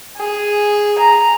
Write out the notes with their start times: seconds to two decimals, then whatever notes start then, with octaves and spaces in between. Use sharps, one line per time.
0.17 G#4
0.99 A#5